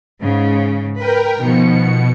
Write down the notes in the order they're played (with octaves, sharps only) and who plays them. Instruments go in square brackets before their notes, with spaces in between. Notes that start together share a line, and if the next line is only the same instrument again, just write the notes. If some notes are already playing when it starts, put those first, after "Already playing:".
[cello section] G#2 C#3
[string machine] A#4 G5 [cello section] B4
[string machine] B2 C#7 [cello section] D#3 F3